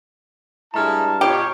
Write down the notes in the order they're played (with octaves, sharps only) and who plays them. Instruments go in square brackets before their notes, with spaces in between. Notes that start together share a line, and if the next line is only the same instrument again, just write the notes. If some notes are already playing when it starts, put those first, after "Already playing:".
[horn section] G2 A5 [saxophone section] G#3 A3 E4 [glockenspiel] A#5 F6
[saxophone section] B2 F4 [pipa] G4 [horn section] C#5